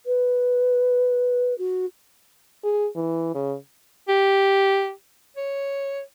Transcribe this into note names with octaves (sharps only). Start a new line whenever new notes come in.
B4
F#4
G#4
E3
C#3
G4
C#5